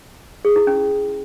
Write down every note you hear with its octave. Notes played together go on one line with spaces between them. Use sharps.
G#4
E4
C#4